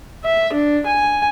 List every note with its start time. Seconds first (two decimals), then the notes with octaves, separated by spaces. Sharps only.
0.25 E5
0.53 D4
0.86 G#5